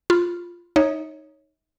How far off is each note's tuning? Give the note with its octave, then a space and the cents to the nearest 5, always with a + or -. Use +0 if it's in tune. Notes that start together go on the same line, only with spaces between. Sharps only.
F4 +0 B5 +0
D#4 +0 C#5 +0 E5 -40